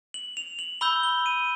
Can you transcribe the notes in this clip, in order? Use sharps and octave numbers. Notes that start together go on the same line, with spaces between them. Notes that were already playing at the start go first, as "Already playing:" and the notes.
F#7
F7
F#7
B5 E6 G6 G7
G7
D#7